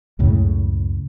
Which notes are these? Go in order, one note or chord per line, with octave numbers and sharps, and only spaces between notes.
C#2 F#2 A2 C#3